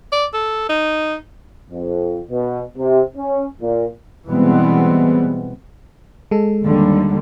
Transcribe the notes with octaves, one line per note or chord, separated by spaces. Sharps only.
D5
A4
D#4
F2
B2
C3
C#4
A#2
B2 E3 G3 G#3 B3 C4
G#3 A4
D#2 D3 G3